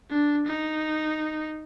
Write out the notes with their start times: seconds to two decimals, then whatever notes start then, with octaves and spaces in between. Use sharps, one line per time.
0.10 D4
0.46 D#4